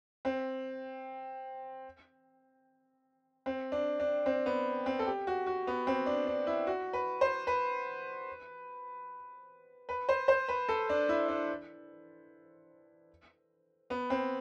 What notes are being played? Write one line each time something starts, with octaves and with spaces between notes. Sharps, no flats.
C4
C4
D4
D4
C4
B3
C4
A4
G4
F#4
F#4
B3
C4
D4
D4
E4
F#4
B4
C5
B4
B4
C5
C5
B4
A4
D4
E4
D4
B3
C4